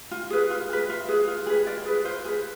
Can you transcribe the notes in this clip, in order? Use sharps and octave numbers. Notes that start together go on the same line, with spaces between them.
F4
G#4 B4
F4
G#4 B4
F4 E5
G#4 B4
F4
G#4 B4
F4 D5
G#4 B4
F4 C5
G#4 B4